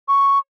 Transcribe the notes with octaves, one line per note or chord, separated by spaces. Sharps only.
C#6